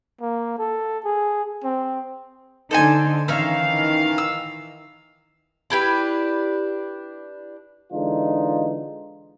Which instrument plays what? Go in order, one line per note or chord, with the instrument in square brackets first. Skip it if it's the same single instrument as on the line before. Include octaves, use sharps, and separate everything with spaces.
[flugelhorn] A#3
A4
G#4
C4
[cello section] D3 D#4 [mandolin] A4 C5 G#5
[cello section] D#3 E3 F5 [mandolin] C#4 D#4 E5
[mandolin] E6
[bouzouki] D4 E4 G4 B4
[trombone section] D3 E3 G#3 D4 D#4 F4